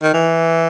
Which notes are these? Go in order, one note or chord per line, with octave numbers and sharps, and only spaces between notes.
D#3
E3